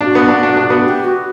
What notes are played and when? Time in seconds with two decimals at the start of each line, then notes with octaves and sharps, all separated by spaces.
0.01 D4 G4
0.05 F#4
0.15 B3
0.29 D4
0.43 D4
0.57 D4
0.70 B3
0.84 G4
1.04 F#4